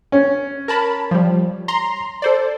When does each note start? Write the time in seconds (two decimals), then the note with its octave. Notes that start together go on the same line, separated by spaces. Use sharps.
0.12 C#4
0.68 A#4 A5 B5
1.11 F3 G3
1.68 A#5 C6
2.22 A4 C5 D5